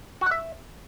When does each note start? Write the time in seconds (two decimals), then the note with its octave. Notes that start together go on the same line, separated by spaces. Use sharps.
0.21 F#4
0.26 F#5
0.31 E5